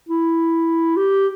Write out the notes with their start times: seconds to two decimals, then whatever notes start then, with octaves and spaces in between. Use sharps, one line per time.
0.09 E4
0.97 G4